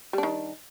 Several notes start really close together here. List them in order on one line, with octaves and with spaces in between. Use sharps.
G3 D4 D#3